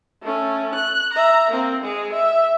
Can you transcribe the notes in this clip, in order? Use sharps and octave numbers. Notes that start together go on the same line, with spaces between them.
A3 C#4
F#6
E5 A#5
A#3 C4
G#3 G#4
E5